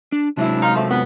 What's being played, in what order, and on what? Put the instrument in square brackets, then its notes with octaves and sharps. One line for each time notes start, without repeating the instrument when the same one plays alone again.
[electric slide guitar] D4
[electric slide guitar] C3 F#3 G#3 [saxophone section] D4 E4
[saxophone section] D#4 F4
F3 A3
F2 B3